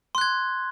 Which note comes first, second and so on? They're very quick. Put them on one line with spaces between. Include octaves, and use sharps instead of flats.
C6 F#6 G#6